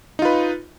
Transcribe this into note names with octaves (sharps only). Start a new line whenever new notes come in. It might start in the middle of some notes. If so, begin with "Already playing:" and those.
D#4 F4 B4